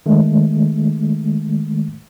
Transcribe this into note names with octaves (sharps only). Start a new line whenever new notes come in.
D#3 G#3 A3